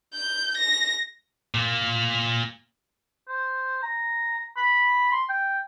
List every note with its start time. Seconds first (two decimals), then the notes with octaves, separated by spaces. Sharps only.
0.14 G6
0.58 A#6
1.54 A#2 A#3
3.29 C5
3.83 A#5
4.57 B5
5.12 C6
5.29 G5